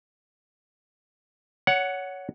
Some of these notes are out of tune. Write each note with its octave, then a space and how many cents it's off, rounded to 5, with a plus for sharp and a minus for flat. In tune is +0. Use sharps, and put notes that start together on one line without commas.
C#5 +20 F#5 +0